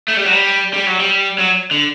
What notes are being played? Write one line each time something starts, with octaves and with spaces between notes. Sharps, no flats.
A3
G3
F#3
G3
G3
F#3
G3
F#3
D3